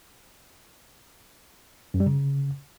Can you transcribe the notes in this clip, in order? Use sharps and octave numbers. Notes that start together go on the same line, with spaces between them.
F#2
G3
C#3